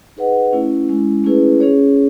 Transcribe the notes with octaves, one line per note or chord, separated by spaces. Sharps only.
D#4 G#4 B4 D#5 F#5
A3 C#4 E4
G#3 C#4 E4
A3 C#4 E4 G#4 B4
C#4 G#4 C#5